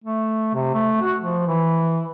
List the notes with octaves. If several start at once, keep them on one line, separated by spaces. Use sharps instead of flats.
A3
C3
A3
F#4
F3
E3